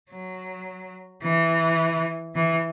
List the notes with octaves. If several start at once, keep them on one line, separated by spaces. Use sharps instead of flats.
F#3
E3
E3